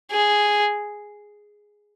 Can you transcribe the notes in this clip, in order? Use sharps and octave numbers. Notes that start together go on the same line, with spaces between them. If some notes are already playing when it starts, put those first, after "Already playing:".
G#4